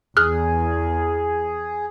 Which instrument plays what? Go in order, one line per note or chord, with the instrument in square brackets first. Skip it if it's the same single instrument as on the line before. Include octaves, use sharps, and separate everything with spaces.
[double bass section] E2 [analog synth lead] G#4 [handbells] F6 F#6